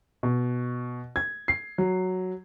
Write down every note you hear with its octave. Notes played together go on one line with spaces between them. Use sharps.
B2
G#6
C7
F#3